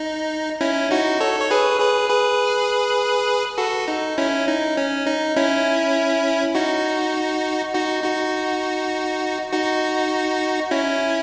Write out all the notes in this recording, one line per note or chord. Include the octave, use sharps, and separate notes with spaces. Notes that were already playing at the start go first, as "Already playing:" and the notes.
Already playing: D#4
C#4 E4
D#4 F#4
A4 C#5
C#5
G#4 B4
G#4 B4
G#4 B4
F#4 A4
D#4
C#4 E4
D#4
C#4
D#4
C#4 E4
D#4 F#4
D#4 F#4
D#4 F#4
D#4 F#4
C#4 E4